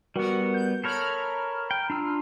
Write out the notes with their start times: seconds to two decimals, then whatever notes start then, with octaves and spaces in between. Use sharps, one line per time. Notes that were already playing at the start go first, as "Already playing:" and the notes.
0.16 G3 B3 F#4 A#4 F#5
0.54 G6
0.84 A4 A#4 C#5 A#5 B5 F6
1.71 G5
1.90 D4 F4 E6